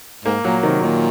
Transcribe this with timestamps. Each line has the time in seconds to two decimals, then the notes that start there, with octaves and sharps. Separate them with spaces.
0.25 G#2 A#3
0.44 A#2 F#3
0.63 C3 D#3
0.81 A#2 D#3